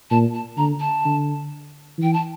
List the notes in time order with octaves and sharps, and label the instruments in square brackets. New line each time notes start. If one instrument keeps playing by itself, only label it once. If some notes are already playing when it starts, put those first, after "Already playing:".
[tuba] A#2 [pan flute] A5
[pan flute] A5
[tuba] D3 [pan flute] A#5
[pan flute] A5
[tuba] D3
[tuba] E3 [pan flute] G5
[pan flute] A5